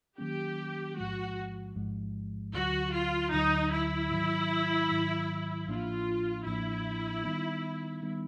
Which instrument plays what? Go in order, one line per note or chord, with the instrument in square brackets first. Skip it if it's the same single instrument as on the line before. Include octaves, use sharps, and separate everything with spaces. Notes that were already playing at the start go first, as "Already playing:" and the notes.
[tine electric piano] D#3 F#3 A#3 C#4 [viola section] G4
[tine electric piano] A1 G#2 F3 G#3 [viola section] F#4
[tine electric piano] A1 G#2 F3 G#3
[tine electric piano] D2 D3 F#3 [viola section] F#4
[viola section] F4
[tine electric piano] D2 D3 F#3 [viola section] D#4
[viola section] E4
[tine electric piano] G#2 D#3 F#3
G#2 D#3 F#3
[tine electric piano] A1 A2 F3 A#3 D4 [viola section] F4
[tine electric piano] A1 A2 F3 A#3 D4 [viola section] E4
[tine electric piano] D#3 G3 B3 D#4
D#3 G3 B3 D#4